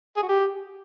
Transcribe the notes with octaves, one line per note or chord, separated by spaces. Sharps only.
G#4
F#4
G4